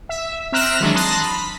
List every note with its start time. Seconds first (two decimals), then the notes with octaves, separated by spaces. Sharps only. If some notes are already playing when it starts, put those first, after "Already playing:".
0.09 E5
0.52 C4 E5 A#5 F6 F#6 E7
0.80 D#3 E3 F#3 G#3 D4
0.95 A5 A#5 C6 D#6 F#6 A#6
1.21 B5